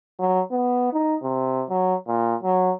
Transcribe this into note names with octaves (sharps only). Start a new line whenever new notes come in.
F#3
B3
D#4
C3
F#3
A#2
F#3